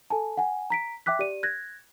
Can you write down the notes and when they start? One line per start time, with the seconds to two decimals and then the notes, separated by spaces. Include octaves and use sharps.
0.10 A4 G#5 A5
0.37 F#5 G#5
0.70 A#5 B6 D7
1.06 E5 G5 D6 F#6 B6
1.19 G4 D5 D#7
1.43 F#6 G#6 A#6